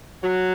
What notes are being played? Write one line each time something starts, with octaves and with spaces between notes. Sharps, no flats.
F#3